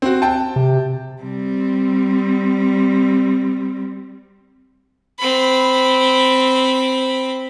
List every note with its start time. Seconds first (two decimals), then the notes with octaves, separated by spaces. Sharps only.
0.02 C4 F#4
0.22 G5 A5
0.56 C3
1.22 G3 C4
5.19 C4 B5